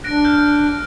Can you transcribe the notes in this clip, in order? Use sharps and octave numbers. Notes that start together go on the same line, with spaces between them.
D4 F#6 A#6 D7
F6 G6